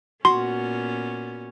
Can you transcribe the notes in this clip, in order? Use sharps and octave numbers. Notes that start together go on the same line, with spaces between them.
A#2 B3 C#4 F#4 C6